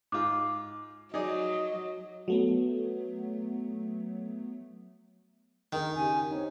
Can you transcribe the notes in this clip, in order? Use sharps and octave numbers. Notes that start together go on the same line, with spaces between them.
G#2 F4 D6
F#3 D#4 G#4 D5 D#5
F#3 A3 B3
D#3 D#4 G#4 A#4
C#3 G4 G#5
C4 D#4 C#5